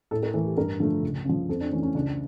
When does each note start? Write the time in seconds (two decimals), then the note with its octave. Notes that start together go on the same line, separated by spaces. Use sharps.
0.11 A2 A4
0.23 A#4
0.34 E3 A3
0.46 G4
0.57 G2 A#4
0.79 D3 F3 A3
1.03 C#2
1.25 C#3 F3
1.49 F2 A4
1.61 D4
1.71 E3 A3 C#4
1.83 C#4
1.94 C#2 D4